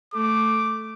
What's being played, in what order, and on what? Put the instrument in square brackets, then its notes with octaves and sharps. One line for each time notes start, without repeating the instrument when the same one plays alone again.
[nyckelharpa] A3 [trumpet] D6